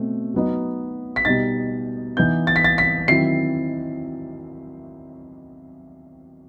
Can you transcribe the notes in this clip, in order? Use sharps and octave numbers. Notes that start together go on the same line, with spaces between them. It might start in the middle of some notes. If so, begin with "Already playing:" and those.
Already playing: B2 A3 C4
F#3 B3 D#4
B6
B2 G3 D#4 A6
E3 B3 D#4 G6
A6
B6
A6
B6
D#3 F#3 C4 E4 C7